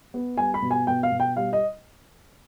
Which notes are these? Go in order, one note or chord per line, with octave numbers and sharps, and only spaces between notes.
B3
G3 G#5
B5
B2
G#5
B2 G5
F5
B2
G5
G3 F5
D#5